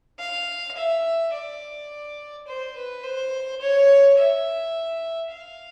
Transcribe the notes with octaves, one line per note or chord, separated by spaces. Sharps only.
F5
E5
D5
C5
B4
C5
C#5
E5
F5